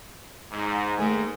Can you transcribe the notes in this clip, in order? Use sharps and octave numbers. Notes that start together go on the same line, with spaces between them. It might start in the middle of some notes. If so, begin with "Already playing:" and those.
G#2
G#2 D#3 A3 A#3 G#4